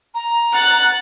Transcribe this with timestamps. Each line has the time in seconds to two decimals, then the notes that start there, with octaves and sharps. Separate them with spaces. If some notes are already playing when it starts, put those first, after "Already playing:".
0.15 A#5
0.53 F#5 F#6 A6